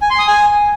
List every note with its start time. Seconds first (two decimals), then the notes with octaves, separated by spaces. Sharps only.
0.02 G#5
0.10 C6
0.19 D#6
0.28 G#5